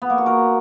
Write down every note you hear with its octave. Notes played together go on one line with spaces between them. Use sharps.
B3
A#3
F#4
A#4